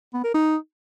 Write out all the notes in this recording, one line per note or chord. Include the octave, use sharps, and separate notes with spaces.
B3
A#4
D#4